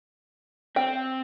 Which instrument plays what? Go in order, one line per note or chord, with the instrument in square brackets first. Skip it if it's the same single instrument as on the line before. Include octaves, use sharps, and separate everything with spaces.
[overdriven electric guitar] C4 [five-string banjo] G5